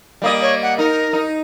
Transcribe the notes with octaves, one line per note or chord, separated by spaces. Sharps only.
G3 A#3 D#5
C#5
F#5
D#4 A#4
D#4